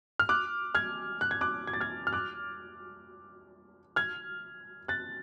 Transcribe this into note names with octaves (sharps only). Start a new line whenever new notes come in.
F6
D6 F#6
F6 G#6
F#6
G#6
D6 F#6
G#6
A6
F6 G#6
F6
D6 F#6
F6 G#6
F#6 A6